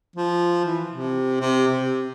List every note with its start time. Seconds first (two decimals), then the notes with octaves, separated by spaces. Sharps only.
0.16 F3
0.65 E3
0.91 C3
1.41 C3
1.68 C3